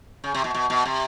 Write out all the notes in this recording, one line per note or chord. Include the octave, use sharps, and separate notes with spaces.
C#3
C3
B2
B2
B2
C3